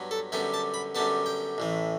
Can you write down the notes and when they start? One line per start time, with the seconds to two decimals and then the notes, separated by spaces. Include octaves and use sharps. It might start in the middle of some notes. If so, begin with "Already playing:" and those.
Already playing: G2 F#3 B3
0.11 A4
0.32 F#2 D3 G3 B3 G5
0.54 A5
0.74 B5
0.95 F#2 D3 G3 B3 A5
1.26 G5
1.58 A1 A2 E3